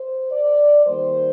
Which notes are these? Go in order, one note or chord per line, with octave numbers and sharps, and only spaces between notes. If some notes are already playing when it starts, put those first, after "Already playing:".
Already playing: C5
D5
D#3 G3 A#3 C5